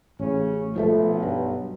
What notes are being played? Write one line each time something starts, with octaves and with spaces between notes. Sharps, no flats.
A1 C#3 C#4
B1 F3 G3 A3
G2